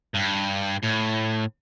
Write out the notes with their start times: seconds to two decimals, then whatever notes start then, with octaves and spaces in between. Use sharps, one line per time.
0.15 G2
0.83 A2